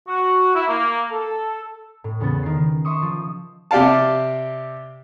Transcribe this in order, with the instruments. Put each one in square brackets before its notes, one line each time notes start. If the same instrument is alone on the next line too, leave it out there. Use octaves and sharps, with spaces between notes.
[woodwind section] F#4
E4
A#3
A4
[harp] A2
E2 C#3 B3 A6
D#3 C7
E5 C6 C#6 D#6
F3
[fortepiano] C3 G4 D5 F5 A5